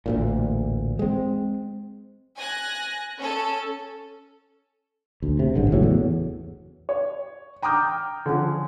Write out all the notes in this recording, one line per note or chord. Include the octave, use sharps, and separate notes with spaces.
A1 D2 A#2
G#3 C4
G#5 F#6 A#6
C#4 A4
D2
C3
A1 G2 D3
F#1 A2 F#3
E2
C#5
G5 A#5 D6 D#6 F6 G6
D3 F3 C#4